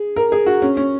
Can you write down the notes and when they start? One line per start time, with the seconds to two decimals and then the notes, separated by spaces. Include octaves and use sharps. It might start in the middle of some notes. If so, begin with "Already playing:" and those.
Already playing: G#4
0.16 A#4
0.32 G#4
0.46 F#4
0.62 C#4
0.77 C#4